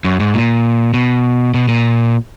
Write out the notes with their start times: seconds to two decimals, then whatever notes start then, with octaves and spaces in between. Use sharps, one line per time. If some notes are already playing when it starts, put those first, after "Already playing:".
0.04 F#2
0.20 G#2
0.34 A#2
0.94 B2
1.54 B2
1.68 A#2